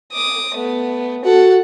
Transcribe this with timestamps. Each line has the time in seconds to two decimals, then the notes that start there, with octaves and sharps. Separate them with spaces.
0.13 D6 D#6
0.55 A3 B3
1.25 F#4 A4 F#5